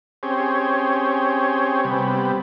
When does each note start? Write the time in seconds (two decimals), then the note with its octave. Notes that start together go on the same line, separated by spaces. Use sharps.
0.23 C4 C#4 G4 G#4
1.84 C3 G3 B3